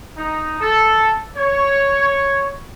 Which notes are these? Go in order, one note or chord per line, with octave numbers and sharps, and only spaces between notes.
D#4
A4
C#5